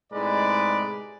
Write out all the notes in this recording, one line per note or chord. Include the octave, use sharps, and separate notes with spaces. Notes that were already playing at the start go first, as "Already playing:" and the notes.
A2 C3 G#3 D#4 B4 D5